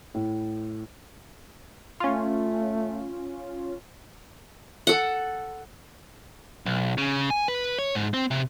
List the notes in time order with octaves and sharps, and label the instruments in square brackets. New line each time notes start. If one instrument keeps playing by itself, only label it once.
[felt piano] A2
[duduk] A3 [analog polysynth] C#4 F4
[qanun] A4 F#5
[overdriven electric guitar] B1
C#3
G#5
B4
C#5
G#2
C4
C3